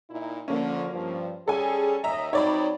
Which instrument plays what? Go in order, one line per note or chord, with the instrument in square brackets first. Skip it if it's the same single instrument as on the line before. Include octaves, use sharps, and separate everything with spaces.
[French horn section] A#2 D#4 E4
[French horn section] D3 F3 [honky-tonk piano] A#3 C#4
[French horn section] G2 F3
[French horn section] G3 C#4 G#4 [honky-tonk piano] A4 G#5
[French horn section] D#2 C#5 D#5 [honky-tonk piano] E5 A#5
[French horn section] F#3 C4 D#4 [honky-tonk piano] C#5 D5 B5